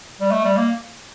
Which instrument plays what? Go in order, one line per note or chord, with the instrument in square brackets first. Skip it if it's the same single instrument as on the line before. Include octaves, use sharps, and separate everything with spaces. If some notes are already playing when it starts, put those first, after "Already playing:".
[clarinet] G3
A3
G3
A#3